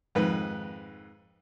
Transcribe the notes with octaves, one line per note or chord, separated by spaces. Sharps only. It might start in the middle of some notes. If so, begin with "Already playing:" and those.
F2 G#2 D#3 B4